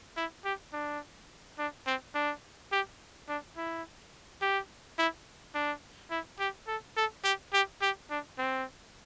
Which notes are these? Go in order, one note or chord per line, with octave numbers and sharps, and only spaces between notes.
E4
G4
D4
D4
C4
D4
G4
D4
E4
G4
E4
D4
E4
G4
A4
A4
G4
G4
G4
D4
C4